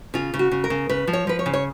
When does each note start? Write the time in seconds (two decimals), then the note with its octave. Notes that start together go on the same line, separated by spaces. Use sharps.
0.14 C#3 F4
0.34 C#3
0.39 F#4
0.52 C#3
0.64 A#4
0.70 C#3
0.89 C#3 B4
1.07 F3
1.13 C#5
1.27 F3 B4
1.39 C#5
1.46 C#3
1.54 C#5